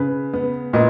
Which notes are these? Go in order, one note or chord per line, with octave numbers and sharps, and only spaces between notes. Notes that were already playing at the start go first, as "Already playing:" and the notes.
Already playing: C#3 B4
B3
A#2 B4 D#5